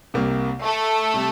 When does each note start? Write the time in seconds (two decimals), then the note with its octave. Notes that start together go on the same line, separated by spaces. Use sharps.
0.14 C2 C3 G3 A#3
0.63 A3 A4
1.14 C3 G3